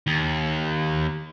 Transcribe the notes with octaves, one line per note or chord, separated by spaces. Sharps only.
D#2